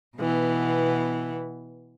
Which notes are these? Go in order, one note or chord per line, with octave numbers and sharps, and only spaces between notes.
B2 E3 B3